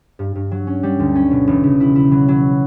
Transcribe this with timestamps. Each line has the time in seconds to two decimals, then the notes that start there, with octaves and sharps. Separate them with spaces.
0.19 G2
0.35 G2
0.51 F#3
0.67 C#4
0.83 G3
0.99 D2
1.15 C#4
1.31 B2
1.47 E1
1.63 C#3
1.80 E4
1.95 E4
2.12 F#3
2.28 F#3